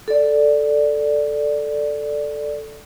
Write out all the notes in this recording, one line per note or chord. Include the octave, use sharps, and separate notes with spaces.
A4 D5